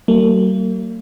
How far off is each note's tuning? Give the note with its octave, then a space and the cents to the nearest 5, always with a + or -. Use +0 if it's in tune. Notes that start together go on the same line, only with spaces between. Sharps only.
F#3 +45 A#3 -40